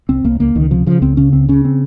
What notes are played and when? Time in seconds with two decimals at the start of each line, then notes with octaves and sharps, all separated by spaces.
0.09 C2 C4
0.24 C2 A#3
0.40 C#2 A#3
0.55 C#2 D#3
0.71 C3 F3
0.86 C#3 F3
1.02 C#2 C4
1.17 C#3 C#4
1.33 C#2 C4
1.48 C#3 C#4
1.65 C4